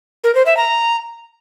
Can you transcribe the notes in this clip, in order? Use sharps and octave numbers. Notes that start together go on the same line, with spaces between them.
A#4
C5
E5
A#5